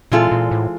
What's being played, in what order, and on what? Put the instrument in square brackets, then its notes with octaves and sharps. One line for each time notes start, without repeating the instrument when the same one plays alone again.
[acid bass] A#2 [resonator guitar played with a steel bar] E3 G#3 C4 F4 A4
[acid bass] A#2
A2